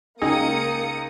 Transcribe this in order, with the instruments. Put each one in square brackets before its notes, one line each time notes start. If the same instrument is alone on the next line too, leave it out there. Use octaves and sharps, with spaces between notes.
[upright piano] C#2 [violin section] A#3 D#6 C#7 [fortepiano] D#4 [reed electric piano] G#4